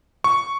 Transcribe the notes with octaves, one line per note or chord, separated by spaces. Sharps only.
C#6